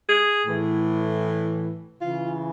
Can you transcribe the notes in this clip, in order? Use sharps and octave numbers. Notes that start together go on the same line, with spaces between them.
G#4
A2 E3
C#3 E3 F4